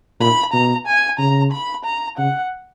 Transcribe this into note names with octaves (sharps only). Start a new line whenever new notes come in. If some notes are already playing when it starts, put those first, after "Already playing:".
A#2 B5
B2 A#5
G#5
C#3 A#5
B5
A#5
C#3 F#5